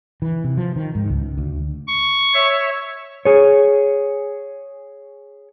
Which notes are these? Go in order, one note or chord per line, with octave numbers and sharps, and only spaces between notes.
E3
C3
F3
D#3
G#2
C#2
D2
C#6
C#5 E5
G#4 C#5